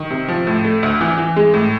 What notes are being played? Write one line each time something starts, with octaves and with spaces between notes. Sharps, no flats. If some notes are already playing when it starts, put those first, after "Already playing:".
Already playing: D#3
C3
F3
A2
A3
D2
E3
E3
G#3
A2